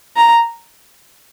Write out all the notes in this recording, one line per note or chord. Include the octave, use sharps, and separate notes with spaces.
A#5